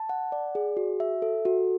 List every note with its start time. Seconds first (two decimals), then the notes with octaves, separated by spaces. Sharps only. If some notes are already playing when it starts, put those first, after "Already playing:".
Already playing: A5
0.09 F#5
0.32 D5
0.55 G#4
0.77 F#4
1.00 E5
1.22 A4
1.45 F#4